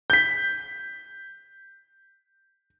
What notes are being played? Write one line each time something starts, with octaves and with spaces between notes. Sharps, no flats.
G6 B6